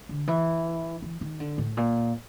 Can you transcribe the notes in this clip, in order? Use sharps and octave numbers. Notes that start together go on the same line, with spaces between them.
D3
E3
E3
D#3
D3
A2
A#2